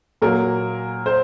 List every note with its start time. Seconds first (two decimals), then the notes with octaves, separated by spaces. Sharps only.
0.22 A#2 F#3 A#3 A#4
1.06 C5